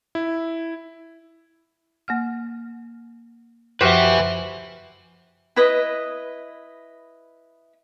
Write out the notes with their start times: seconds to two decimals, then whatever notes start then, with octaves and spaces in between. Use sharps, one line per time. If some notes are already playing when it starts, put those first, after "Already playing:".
0.15 E4
2.08 A#3 F#5 F6
3.81 F#2 F3 F#4 G4 B4 C5 E5
5.56 E4 B4 D#5